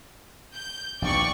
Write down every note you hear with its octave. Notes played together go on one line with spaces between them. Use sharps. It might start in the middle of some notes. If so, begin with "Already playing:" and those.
G6
A#1 D#2 B2 D5 G5 C#6